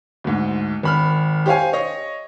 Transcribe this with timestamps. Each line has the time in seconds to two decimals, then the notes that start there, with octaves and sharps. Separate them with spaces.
0.24 D2 G#2
0.83 G#1 B5 F6
1.46 G4 C5 C#5 F5 G#5
1.73 C#5 D#5